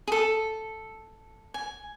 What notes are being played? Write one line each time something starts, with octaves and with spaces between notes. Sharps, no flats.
G#4
A4
G#5